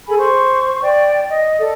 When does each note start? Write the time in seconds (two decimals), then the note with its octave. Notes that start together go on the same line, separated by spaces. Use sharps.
0.07 G#4 A4 G#5 B5
0.19 C5 C#6
0.82 D5 G5
1.28 D#5
1.59 A4 D5